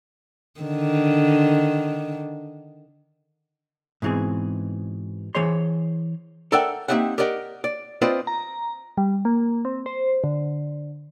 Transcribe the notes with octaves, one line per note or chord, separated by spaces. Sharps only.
D3 D#3
G#2 B2 E3 C4 G#4
E3 G#4 C5 C#5 C6
A4 A#4 D5 E5 F#5 G5
A#3 C4 D#4 G4 E5 F#5
G4 A#4 D5 D#5 F#5
D5
C4 F4 B4 C5 D5 D#5
A#5
G3
A#3
C4
C5
D3